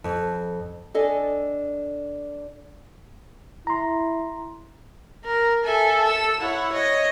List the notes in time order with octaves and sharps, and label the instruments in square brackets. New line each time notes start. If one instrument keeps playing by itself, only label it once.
[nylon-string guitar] F2
D4 A4 D#5 G#5
[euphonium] E4 [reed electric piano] A#5 C6
[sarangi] A#4
[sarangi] A4 [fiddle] E5 G#5
[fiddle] E6
[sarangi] E4 [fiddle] C#5 F#5
[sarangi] C#5 [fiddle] D#5